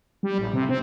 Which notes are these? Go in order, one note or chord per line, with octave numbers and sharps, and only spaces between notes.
G3
A1
C3
C4